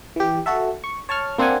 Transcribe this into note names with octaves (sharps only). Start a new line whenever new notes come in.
E3 G4
F#4 A4 E5
C#6
C#5 A5 C#6 F6
A#3 C4 D4 F#5 G#5